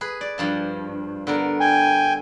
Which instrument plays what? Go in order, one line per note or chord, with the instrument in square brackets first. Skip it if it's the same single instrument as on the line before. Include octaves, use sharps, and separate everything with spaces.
[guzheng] G#4 B4
D5
G2 F3 A5
D3 B3 A#4
[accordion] G5 G#5